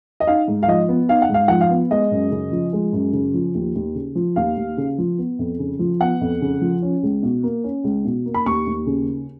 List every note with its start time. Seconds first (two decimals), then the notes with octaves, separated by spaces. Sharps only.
0.20 D#5
0.27 D#4 F5
0.48 G#2
0.63 F5
0.68 F3 D#5
0.89 B3
1.09 D#4 F5
1.22 F#5
1.29 G#2
1.34 F5
1.48 F3 F#5
1.61 F5
1.70 B3
1.91 G#3 D#5
2.11 F#2
2.31 C#3
2.51 F3
2.73 G#3
2.93 F#2
3.13 C#3
3.34 F3
3.55 D#2
3.76 D#2
3.95 C#3
4.15 F3
4.36 D#2 F5
4.57 D#2
4.77 C#3
4.98 F3
5.18 B3
5.39 F2
5.59 C#3
5.79 F3
6.00 B3 F#5
6.21 F2
6.41 C#3
6.61 F3
6.82 C#4
7.03 C#2
7.23 B2
7.43 A#3
7.64 C#4
7.84 C#2
8.05 B2
8.26 A#3
8.34 B5
8.46 D#2 C#6
8.67 D#2
8.86 C#3